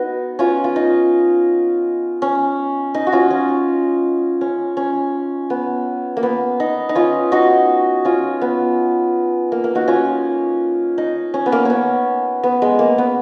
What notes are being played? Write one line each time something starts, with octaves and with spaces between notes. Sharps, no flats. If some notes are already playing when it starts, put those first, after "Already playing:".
Already playing: B3 D#4 F#4
C#4 F4
F4
D#4
C#4
D#4
F#4
C#4 F4
C#4
C#4
C#4
B3
A#3
B3
D#4
D#4
C#4 F4
D#4 F#4
C#4 F4
B3
A#3
A#3
D#4 F#4
C#4 F4
D#4
C#4
B3
A#3
B3 C#4
B3
G#3
A#3
B3